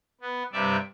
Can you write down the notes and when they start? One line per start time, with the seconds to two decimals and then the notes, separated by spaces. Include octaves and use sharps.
0.21 B3
0.52 G2 C3 G3 D5 E5